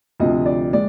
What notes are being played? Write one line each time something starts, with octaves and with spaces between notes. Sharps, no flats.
D2 C3 F3 D#5
D5
G#3 D5